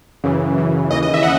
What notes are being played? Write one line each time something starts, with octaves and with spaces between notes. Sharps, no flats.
F#2 C#3 E3
F#2 C#3 E3
D#2 C#3 E3 D#5
D#5
E5
F#5